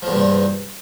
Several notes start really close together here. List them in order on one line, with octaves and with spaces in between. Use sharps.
F3 E2 G2 A#2